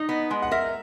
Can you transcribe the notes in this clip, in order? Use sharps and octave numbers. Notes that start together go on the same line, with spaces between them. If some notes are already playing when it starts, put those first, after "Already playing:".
Already playing: D#4 D#5
B3
G#3
F#5
A#4 E5